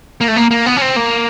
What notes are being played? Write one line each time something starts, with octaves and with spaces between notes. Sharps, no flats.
A#3
A3
A#3
A#3
B3
C#4
C4
A#3